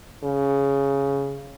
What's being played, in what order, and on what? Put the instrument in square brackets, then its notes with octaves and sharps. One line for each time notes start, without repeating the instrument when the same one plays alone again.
[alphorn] C#3